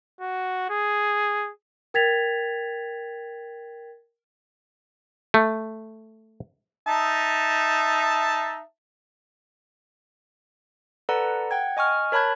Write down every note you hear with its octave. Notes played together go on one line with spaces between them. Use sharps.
F#4
G#4
A#4 G5 G#6 A6 B6 F7
A3
D#4 E5 A5
A4 B4 D5 F#5 A#5
F#5 G5 G#6
D#5 G#5 C#6 F6
A#4 C#5 A5 B5 F#6 G#6